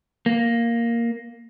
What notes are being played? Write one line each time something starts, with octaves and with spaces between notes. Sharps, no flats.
A#3